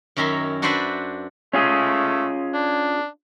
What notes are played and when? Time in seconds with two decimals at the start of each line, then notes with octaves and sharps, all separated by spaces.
0.17 F#2 D#3 C#4 E5 A#5 C6
0.62 D4 F#4 B4 C5 D5 E5
1.54 A3 C#4 F4 G#4
2.54 D4